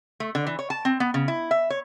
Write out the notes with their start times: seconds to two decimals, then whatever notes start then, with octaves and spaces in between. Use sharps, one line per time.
0.20 A3
0.35 D3
0.47 E3
0.59 C#5
0.70 A5
0.85 C4
1.00 B3
1.14 C#3
1.28 E4
1.51 E5
1.70 C#5